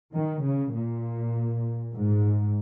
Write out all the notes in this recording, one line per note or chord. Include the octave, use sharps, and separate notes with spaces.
D#3
C#3
A#2
G#2